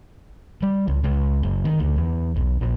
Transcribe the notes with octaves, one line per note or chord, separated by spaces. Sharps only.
G3
C#2
C#2
F#1
D#3
D2
E2
B1
A#1